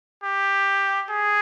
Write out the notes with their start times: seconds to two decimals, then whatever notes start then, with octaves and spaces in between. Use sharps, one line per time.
0.24 G4
1.10 G#4